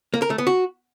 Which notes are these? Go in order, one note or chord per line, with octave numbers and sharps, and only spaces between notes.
A#3
A#4
A3
B3
F#4